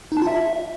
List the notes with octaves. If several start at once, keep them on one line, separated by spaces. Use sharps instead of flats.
D#4
A5
F4
E5